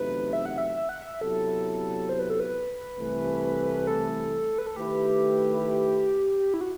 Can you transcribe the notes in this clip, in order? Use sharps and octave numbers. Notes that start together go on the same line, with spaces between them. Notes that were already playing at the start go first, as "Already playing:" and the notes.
Already playing: E2 C3 F#3 A3 D#4 B4
E5
F#5
E5
E5
F#5
E5
C3 F#3 B3 E4 A4
C5
B4
A4
B4
C2 C3 E3 A3
A4
B4
A4
D#3 A3 E4 G4 B4
E4
F#4